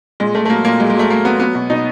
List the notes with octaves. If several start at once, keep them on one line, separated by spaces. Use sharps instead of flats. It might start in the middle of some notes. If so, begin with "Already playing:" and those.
A#2 G#3
A#2 A3
A3
F#3 A#3
A#2 A#3
F#3 G#3
G#3
F#3 A3
F#3 A#3
F#3 B3
F#3 B3
B2
B2 D#4